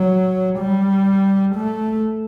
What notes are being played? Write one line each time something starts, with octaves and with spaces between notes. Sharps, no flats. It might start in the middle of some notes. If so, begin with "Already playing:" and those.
Already playing: F#3
G3
A3